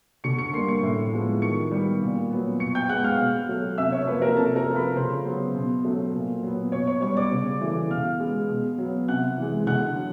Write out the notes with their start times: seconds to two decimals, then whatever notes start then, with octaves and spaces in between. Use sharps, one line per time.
0.24 D3 C#6 C#7
0.38 C#6 C#7
0.53 G3 A#3 C6 C7
0.68 C#6 C#7
0.83 A2
1.13 F3 G#3 B3
1.42 D#3 C#6 C#7
1.71 G3 B3
2.02 A#2
2.31 F#3 B3
2.60 B2 C#6 C#7
2.75 G5 G6
2.89 G#3 B3 F#5 F#6
3.04 F5 F6
3.19 B2
3.49 F#3 A3
3.78 C3 E5 E6
3.92 C#5 C#6
4.07 F3 A#3 B4 B5
4.22 A#4 A#5
4.37 C3 A4 A5
4.56 A#4 A#5
4.66 F3 A3
4.76 B4 B5
4.96 C#3 C5 C6
5.26 F#3 B3
5.55 B2
5.85 F#3 A3
6.13 A#2
6.43 F#3 B3
6.72 B2 C#5 C#6
6.87 C#5 C#6
7.02 G3 B3 C#5 C#6
7.17 D5 D6
7.31 C#3
7.61 E3 A3
7.90 B2 F5 F6
8.20 G#3 B3
8.49 B2
8.78 F#3 B3
9.08 C3 F#5 F#6
9.38 E3 G#3
9.67 D3 F#5 F#6
9.97 F#3